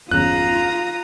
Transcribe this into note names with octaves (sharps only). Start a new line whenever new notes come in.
G1 E2 C#3 F4 A#5 D#6 F#6